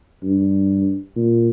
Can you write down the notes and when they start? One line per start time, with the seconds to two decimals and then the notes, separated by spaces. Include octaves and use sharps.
0.23 G2
1.16 A#2